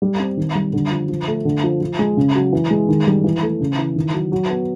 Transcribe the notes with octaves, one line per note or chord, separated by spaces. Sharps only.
G3
C4
D#3
G3
D3
F3
F3
A3
D3
F3
F3
G#3
C#3
F#3
E3
G#3
D#3
G3
E3
A3
C#3
E3
D#3
F#3
F#3
B3